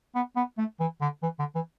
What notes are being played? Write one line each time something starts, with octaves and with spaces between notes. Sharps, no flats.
B3
B3
A3
E3
D3
E3
D3
E3